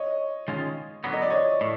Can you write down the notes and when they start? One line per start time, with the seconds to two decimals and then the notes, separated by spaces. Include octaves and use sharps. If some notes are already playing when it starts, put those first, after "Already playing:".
Already playing: C#5 D#5
0.48 D#3 G#3 C#4 F4
1.04 D3 F#3 B3
1.13 D#5
1.22 D5
1.30 C#5 D#5
1.61 A2